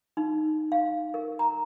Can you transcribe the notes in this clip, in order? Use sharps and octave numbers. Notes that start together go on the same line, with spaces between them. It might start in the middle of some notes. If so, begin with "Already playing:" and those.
D#4
F5
A#4
A#5